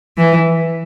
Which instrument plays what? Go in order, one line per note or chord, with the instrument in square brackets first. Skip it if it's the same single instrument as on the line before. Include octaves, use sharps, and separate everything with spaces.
[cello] E3